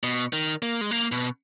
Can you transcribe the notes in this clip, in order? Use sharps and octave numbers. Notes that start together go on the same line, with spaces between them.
B2
D#3
A#3
G#3
A#3
B2